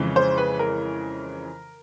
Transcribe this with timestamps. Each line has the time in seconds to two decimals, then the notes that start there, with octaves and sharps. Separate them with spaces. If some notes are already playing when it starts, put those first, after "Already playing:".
Already playing: F2 C#3 E3 G#3 C#4
0.16 C5
0.38 B4
0.59 A#4